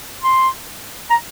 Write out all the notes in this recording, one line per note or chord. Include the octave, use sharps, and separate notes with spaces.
C6
A#5